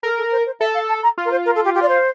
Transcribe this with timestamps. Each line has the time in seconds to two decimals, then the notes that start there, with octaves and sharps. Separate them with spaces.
0.03 A4 A#4
0.17 A4
0.32 C5
0.46 C5
0.60 A4 E5
0.74 F5
0.88 A5
1.03 A#5
1.18 F4
1.25 A#4
1.31 C5
1.45 A#4
1.55 A4
1.64 G4
1.74 G4
1.82 D5
1.88 C5